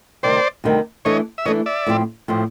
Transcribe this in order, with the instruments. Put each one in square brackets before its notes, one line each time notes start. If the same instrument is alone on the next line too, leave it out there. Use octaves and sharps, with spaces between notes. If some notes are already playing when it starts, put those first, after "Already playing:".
[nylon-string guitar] D2 C3 D#3 G3 [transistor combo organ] C5 D5
[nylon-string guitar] D2 C3 D#3 G3
[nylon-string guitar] E3 A3 D4 [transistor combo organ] C#5 D#5
[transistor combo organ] E5
[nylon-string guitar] E3 A3 D4 [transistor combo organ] C#5 D#5
[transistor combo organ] D5 E5
[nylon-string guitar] A2 F3 A3 C4
A2 F3 A3 C4